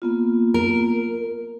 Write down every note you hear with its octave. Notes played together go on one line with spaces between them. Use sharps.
A#3 B3 F4
A#4